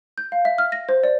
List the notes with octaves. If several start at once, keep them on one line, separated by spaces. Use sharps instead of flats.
G6
F5
E5
F6
A#6
C5
D5